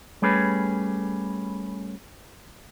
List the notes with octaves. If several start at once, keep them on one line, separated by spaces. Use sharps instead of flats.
G3 A3 C#4 G#4 B4